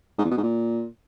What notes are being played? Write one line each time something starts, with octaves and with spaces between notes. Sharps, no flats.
G#2
E2
B2
G#2
A#2